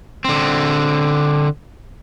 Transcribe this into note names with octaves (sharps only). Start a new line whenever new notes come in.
D3 C4